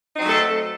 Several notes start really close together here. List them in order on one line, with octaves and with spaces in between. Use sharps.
D#4 C4 F#3 A3 A4